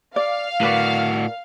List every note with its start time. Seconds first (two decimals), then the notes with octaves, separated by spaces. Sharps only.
0.16 D5 F5
0.61 A2 F#4 A#4 B4 D5